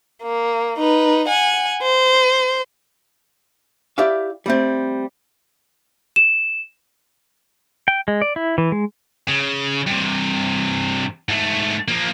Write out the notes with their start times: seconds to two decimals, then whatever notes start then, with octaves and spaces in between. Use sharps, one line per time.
0.23 A#3
0.79 D#4 B4
1.28 F#5 G#5
1.82 C5
3.98 E4 G4 D5 E5 F5
4.46 G3 A3 C4
6.16 E7
7.88 G5
8.08 G#3
8.22 D5
8.36 E4
8.58 E3
8.72 G#3
9.29 C#3
9.87 G2 C3
11.28 G#2 A3
11.88 F3 A#3